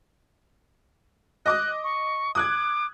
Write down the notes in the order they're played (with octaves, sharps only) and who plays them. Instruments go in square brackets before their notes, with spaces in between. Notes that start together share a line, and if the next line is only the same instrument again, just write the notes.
[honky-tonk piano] D#5 D6 D#6 [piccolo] F#6
[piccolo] C#6
[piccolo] D6 [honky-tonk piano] D#6 F#6 G#6